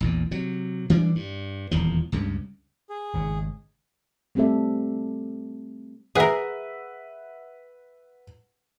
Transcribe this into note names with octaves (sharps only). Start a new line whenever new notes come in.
A#1 E2 A#2
C3 F#3
E3 G3 D4
G2
D#1 E2 F3
C#2 G2 C#3
G#4
G#1 G#2 C#3
G3 A3 C4 G4 A4 E5
G#4 A#4 B4 E5 F#5